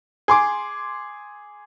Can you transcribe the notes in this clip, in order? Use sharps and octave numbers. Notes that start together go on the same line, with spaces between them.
G#4 C6 D6